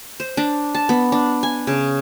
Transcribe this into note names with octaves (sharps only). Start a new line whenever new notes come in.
C5
D4
A5
B3
D4
G#5
C#3